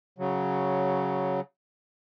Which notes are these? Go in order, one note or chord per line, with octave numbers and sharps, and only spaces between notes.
C#3 F#3